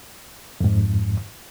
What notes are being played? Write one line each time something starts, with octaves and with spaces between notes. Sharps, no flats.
F2 G#2